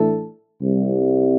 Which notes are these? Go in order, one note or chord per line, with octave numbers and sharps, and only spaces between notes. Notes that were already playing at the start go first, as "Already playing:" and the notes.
Already playing: A2 E3 A3 D4 A4
C2